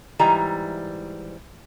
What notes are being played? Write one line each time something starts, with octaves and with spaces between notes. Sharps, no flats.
G#2 E3 G3 A#5